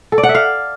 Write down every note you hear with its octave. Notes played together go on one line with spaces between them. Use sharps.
A4
D5
F#5
E5
F5